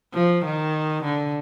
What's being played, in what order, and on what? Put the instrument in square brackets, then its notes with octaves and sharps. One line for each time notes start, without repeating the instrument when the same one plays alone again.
[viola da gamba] F3
D#3
D3